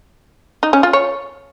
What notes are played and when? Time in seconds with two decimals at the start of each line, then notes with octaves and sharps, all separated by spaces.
0.63 D#4
0.73 C#4
0.83 F4
0.93 C#5